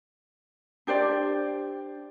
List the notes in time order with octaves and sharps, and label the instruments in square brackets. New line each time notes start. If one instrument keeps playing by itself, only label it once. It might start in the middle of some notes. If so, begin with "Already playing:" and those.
[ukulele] D4 G4 C5 D5